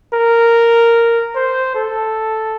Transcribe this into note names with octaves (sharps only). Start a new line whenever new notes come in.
A#4
C5
A4